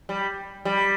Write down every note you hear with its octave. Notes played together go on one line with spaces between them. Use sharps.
G3
G3